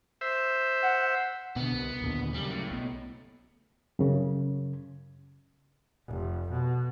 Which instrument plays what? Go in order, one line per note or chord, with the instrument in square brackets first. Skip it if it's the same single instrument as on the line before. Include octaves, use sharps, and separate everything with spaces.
[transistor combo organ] C5 E5
[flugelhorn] F#5
[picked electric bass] B2 D3 [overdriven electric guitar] B3
[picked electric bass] C2
D#2 A#2 D3
[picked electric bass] F#2 C#3 [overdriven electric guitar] G3
[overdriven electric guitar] A2
[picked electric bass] B1 B3
[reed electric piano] F#2 C#3
[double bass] F1
B2